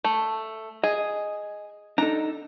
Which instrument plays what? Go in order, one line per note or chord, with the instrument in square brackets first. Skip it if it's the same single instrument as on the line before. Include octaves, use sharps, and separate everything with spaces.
[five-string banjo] A3
[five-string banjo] G#4 [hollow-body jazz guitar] D#5
[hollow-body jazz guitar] D4 D#4 A4 [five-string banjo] A#5